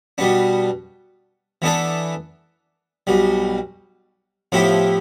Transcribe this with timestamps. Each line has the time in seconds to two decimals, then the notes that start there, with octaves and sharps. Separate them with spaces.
0.18 B2 G3 B3 D4
1.62 E3 B3 D4 A4 D5
3.07 B1 B2 G3
4.52 A2 F3 B3 E4 G4